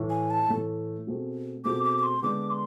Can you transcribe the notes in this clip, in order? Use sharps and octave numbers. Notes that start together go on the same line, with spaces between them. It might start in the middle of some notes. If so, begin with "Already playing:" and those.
Already playing: A2 E3 A3
G#5
A5
A2 E3 A3
B2 A3 C4 G#4
B2 A3 C4 G#4 D6
D6
D6
C6
D3 G#3 B3 D4 D6
C6